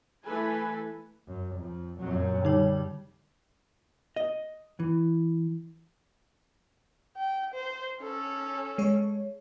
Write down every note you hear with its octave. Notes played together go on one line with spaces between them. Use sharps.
E3 A3 A4 B4 G#5
F#2
F2
F#2 A#2 F#3
D3 G3 D#4 C#5
D#5
E3
G5
C5
C#4 A4
G#3 C#5